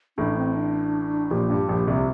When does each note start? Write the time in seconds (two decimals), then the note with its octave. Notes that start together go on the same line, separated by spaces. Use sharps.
0.18 A1 A2 D4
0.37 C4
0.56 D4
1.31 A#1 A#2 G4
1.50 G2
1.69 A#1 A#2
1.87 C2 C3